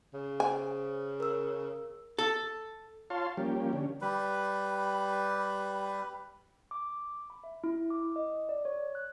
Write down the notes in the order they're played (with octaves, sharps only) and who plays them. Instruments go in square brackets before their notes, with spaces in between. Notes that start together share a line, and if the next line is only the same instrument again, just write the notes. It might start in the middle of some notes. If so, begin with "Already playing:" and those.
[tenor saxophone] C#3
[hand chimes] C5 [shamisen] G#5
[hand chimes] A#4 E6
[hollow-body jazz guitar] A4
[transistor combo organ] F4 C#5 F5 A5 C6
F3 G3 A#3 C#4 G4
D3 C#4
[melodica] G3 B4
[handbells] D6
B5
E5
E4
D6
D#5
D5
C#5
F#6